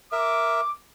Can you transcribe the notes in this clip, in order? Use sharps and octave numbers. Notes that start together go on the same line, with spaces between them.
A#4 E5 D6